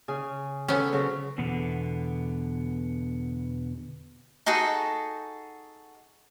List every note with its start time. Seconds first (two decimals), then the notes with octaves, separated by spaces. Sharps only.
0.08 C#3 G#4 G#5
0.68 B3 C#4 A4 B4 C5
0.93 C#3 F#3
1.38 E2 B2 D3 B3
4.46 D#4 F#4 G#4 A4